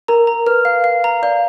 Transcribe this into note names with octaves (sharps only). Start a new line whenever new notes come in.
A#4 A#5
A#5
B4 F6
F5
F5
A#5
D5 F5